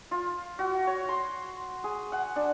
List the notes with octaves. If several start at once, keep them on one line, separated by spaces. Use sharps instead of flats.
F4
F#4
C#5
C6
G#4
F#5
D4